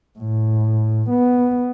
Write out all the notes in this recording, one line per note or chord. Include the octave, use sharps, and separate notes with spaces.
A2
B3